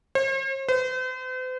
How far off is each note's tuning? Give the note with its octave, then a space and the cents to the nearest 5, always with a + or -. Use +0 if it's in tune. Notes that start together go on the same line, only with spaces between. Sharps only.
C5 +45
C5 -45